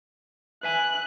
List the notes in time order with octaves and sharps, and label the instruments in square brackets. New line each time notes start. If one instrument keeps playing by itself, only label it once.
[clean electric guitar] B4 E5 G#5 [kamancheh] F#6